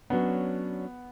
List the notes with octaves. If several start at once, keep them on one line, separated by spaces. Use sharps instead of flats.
F#3 B3 C#4 D4